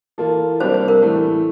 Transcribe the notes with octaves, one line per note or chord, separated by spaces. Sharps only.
E3 A#3 F4 A4
C3 G3 A#3 D4 G4 C5
C5
A#4
A2 E3 A3